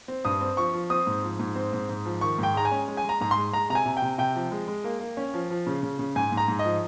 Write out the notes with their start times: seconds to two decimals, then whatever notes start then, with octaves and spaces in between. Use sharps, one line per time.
0.08 C4
0.25 G2 D#6
0.41 C4
0.57 F3 C#6
0.73 F3
0.90 C4 D#6
1.07 G#2
1.23 F3
1.39 G#2
1.56 C4
1.73 G#2
1.89 G#2
2.05 F3
2.21 D#3 C#6
2.39 G#2 G5
2.55 G#3 A#5
2.65 G#5
2.71 C#4
2.88 G#3
2.97 G#5
3.04 G#3
3.09 A#5
3.21 G#2 A#5
3.31 G#3 C6
3.53 G#3 A#5
3.70 C3 A#5
3.75 G#5
3.86 C3
3.97 G5
4.02 C3
4.18 C3 G5
4.35 F3
4.51 G#3
4.68 G#3
4.84 A#3
5.00 A#3
5.17 C#4
5.34 F3
5.50 F3
5.67 C#3
5.83 C#3
5.99 C#3
6.15 G#2 G#5
6.32 G#2
6.37 A#5
6.48 G#2
6.59 D#5
6.65 F3